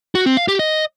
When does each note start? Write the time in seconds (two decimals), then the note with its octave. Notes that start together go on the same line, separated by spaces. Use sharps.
0.15 F#4
0.26 C4
0.37 F5
0.48 G4
0.59 D#5